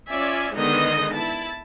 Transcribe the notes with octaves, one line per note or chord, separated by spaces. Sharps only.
C#4 F4 D5 E5 G#5
D3 D#3 G#3 B3 D#4 D#5
E4 A5